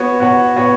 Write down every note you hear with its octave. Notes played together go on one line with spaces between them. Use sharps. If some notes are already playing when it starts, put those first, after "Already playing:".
Already playing: B3 F#4 C#5
B3 F#4 C#5
B3 F#4 C#5